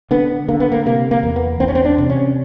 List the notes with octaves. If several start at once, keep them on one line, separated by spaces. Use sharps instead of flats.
D3 B3
D3 A#3
B3
A#3
C3 A#3
A#3
E2
B3
E2 C4
C#4
C4
D4
C3
C#4